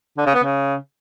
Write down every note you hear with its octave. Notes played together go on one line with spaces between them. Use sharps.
D3
C#3
B3
C#3